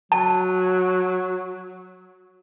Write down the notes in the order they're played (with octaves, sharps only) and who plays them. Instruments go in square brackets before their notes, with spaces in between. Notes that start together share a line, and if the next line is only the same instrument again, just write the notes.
[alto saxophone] F#3 [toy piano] A5